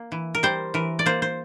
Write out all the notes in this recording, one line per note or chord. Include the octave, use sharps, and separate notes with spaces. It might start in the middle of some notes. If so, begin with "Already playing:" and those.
Already playing: A#3
E3
A#4
G3 C5
E3 A#4
D5
A#3 C5
C5